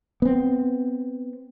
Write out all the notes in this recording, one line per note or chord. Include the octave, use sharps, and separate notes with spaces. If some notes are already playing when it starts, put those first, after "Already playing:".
B3 C4